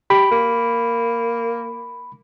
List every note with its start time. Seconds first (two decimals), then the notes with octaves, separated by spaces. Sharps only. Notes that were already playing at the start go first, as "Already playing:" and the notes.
0.10 G4 B5
0.31 A#3